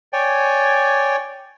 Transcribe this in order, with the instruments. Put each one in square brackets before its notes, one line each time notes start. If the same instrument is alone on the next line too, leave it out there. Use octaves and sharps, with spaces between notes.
[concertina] C#5 D5 G5 G#5